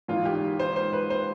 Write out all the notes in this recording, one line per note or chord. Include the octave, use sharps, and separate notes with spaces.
G#1 G#2 E3 F4
G4
C5
C5
B4
C5